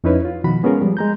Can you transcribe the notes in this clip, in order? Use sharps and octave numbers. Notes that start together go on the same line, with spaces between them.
F2 C#4 D#4 E4 B4 C#5
F4
B2 D#3 F3 F#4 B5
G#3 B3 C#4 F4 G#4 A#4
F3 G3
G#3 A#5 G6